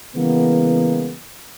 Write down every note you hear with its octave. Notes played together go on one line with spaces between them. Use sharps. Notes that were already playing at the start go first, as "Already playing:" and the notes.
C#3 E3 G#3 A#3 B3